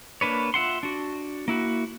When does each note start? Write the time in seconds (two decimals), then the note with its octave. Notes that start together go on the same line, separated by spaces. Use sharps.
0.21 A#3 D4 B4 C#5
0.54 F4 E5 F#5 C6
0.83 D4 F#4
1.48 A#3 E4 F#4